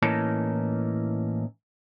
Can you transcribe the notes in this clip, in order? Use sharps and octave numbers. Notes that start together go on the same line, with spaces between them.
A2 E3 A#3 C#4 D#4 A4